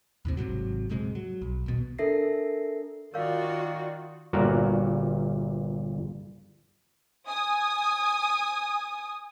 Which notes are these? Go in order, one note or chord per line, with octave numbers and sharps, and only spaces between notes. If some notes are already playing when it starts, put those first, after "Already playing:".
D#2 A2 C3
G#1 G#2 C3 F#3
D#1 G#2 C3 G#3
F#3
B1
D#1 B2
D4 A4 A#4 E5 A#6 C7
D#3 F4 F#4 A#4 C#5 D5 F5
G1 G2 A#2 F#4 A#4
G#5 D#6